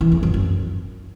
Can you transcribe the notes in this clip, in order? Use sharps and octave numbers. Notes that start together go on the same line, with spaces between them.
E3
E2
F#2
F#2